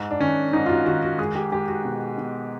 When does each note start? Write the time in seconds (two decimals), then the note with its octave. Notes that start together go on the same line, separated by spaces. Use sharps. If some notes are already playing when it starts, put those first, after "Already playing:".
Already playing: G#2
0.11 D4
0.20 D#3 C#4
0.53 G#2 D#4
0.66 F4
0.69 F#4
0.85 D#3 F#4
1.03 F#4
1.18 G#3 G#4
1.35 G4
1.52 G#3 G4
1.68 F#4
1.85 B2
2.18 B2